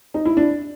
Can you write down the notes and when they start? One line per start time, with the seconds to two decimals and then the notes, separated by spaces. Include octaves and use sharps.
0.14 D#4
0.25 E4
0.37 D4